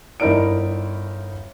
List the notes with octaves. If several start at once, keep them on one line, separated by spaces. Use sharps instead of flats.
G1 D#4 E4 A#4 D5 D7